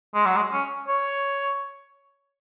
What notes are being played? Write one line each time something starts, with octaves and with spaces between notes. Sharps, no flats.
G#3
F#3
G#3
C#4
C#5